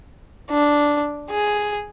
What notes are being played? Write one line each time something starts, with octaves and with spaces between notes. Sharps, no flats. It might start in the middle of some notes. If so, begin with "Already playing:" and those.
D4
G#4